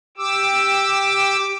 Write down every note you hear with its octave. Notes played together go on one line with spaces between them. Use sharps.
G4 D6 E6